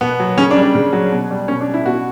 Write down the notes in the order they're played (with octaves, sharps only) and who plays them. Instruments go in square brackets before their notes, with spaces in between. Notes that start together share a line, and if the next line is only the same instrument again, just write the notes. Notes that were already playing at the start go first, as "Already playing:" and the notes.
[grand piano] B2 B3
F#3
C#3 C#4
D4
G3
D4
C#3
F#3
B2
G3
B2 C#4
D4
G3
E4
B2 F#4